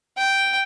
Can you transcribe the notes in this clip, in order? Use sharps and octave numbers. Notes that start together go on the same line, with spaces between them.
G5